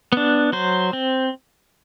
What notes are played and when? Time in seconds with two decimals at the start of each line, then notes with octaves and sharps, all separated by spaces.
0.12 B3 D4
0.53 F#3 C5
0.93 C4